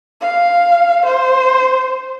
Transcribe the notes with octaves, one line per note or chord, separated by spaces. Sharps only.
F5
C5